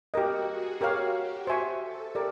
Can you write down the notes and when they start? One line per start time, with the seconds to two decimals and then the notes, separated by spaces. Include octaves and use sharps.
0.13 F#4 G4 A#4 D#5
0.48 G#4
0.80 F#4 G4 A#4 C#5 F5
1.14 G4
1.47 C5 E5 G#5 C#6
1.82 A4
2.15 G4 A#4 D5